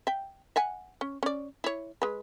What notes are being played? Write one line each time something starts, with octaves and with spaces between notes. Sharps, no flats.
E5 G5
E5 F#5 G#5
C#4
C#4 D5
E4 C#5
G#3 B4